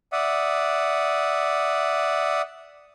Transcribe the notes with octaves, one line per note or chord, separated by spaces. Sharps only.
D5 E5 F#5 D#6